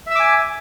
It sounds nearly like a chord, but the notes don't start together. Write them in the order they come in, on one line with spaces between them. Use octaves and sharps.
E5 E6 D6 G#5